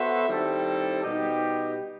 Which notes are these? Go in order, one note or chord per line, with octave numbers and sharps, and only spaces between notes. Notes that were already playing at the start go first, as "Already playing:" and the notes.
Already playing: B3 F#4 A4 C5 E5
D#3 G3 C4 E4 A4
B2 G3 D#4 G4